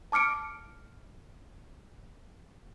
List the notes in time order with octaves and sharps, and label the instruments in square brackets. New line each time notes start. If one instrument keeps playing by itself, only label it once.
[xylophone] A5 D6 F6 C#7 D7